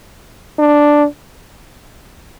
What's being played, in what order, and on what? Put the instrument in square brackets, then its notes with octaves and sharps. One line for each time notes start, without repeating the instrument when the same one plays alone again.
[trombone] D4